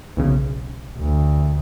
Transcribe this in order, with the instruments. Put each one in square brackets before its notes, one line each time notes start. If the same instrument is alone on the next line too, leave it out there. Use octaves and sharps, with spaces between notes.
[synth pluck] B1 C#3
[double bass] D2